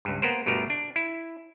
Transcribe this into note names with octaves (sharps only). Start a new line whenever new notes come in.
C#2 G2
A#3 B3 A#4 C5
G1 B2 D3 A3 A#4
D4
E4